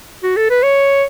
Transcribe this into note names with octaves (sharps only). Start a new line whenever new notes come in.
F#4
A4
B4
C#5